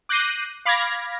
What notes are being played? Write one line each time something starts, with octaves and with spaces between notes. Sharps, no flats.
D6 F#6 G6 A#6 C7 D#7
F5 B5 D6 F6 G#6 A#6